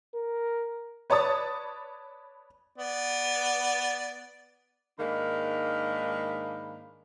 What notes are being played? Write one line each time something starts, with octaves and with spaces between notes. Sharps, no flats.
A#4
B4 C#5 D5 A5 D#6 A6
B3 D5
G#2 D#3 G#3 A#3 D4 B5